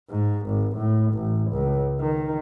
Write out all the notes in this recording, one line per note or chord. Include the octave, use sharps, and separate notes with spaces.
G#2
G#1
A2
A1
C#2
D#3